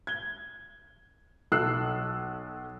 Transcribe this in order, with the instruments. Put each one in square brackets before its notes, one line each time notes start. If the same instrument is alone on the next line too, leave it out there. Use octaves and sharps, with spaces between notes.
[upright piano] G#6 G7
B1 A4 E6 F#6 C7